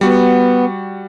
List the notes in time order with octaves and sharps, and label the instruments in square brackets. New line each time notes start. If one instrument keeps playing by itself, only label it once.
[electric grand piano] G3 F#4 [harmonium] B3